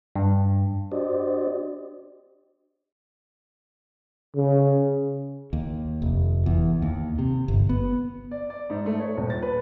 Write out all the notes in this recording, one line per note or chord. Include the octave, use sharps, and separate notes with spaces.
G2
D4 F#4 G4 C5 D5 D#5
C#3
D#2
F1
E2
D#2
C3
G1
B3
D5
D5
G#2
A3
C#5
D#1
A6
B4